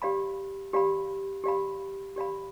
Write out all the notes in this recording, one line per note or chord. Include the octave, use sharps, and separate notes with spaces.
G4 D5 F5 B5
G4 D5 F5 B5
G4 D5 F5 B5
G4 D5 F5 B5